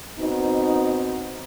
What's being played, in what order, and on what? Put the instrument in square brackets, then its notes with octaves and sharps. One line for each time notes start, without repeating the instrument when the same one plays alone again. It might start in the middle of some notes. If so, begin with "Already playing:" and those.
[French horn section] B2 C4 D#4